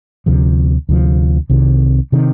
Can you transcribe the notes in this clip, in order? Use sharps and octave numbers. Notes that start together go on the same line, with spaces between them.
D2 C3 F3
D2 C3 F3
C2 C3 D#3
C3 D#3